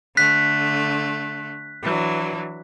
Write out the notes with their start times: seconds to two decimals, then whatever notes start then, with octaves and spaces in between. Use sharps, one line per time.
0.17 D3 A3 F#6 B6
1.84 E3 F#3 D4